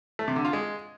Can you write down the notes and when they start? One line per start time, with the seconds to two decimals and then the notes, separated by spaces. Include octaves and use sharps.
0.19 A3
0.28 C3
0.36 D3
0.45 F4
0.53 G#3